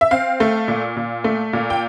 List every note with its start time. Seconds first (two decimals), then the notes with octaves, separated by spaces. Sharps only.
0.01 E5
0.11 C4 F5
0.40 A3
0.68 A#2
0.96 A#2
1.24 A3
1.53 A#2
1.70 G5